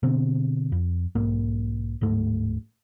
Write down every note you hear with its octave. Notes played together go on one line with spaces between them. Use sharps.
B2 D3 C4
F2
B1 G#2 A#3
D1 G#2 A3